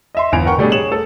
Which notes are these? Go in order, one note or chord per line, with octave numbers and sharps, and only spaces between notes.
D#5 E5 C6
G1 E2 G#5 D7 F7
A#4 F#5 G5 C#6
B2 G3 A3 D4 G#4
G#4 C#5 E7 F#7
A4